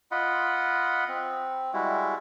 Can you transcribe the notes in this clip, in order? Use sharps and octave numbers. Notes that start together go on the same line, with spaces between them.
F4 D#5 F#5 B5
C4
G3 G#3 E4 F#4